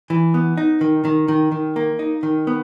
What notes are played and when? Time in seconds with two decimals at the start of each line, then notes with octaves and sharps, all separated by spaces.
0.10 E3
0.34 B3
0.57 D#4
0.81 D#3
1.05 D#3
1.28 D#3
1.52 D#3
1.76 A#3
1.99 D#4
2.23 D#3
2.47 B3